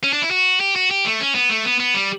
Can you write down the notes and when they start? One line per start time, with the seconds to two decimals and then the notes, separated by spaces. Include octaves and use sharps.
0.04 C#4
0.13 D4
0.22 E4
0.31 F#4
0.60 G4
0.76 F#4
0.91 G4
1.06 A3
1.20 C#4
1.35 B3
1.50 A3
1.65 B3
1.80 B3
1.94 G3